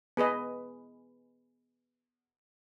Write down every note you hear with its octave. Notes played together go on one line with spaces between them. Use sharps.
B3 G#4 B4 D#5